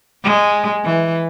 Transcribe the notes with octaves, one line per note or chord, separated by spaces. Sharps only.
G#3
E3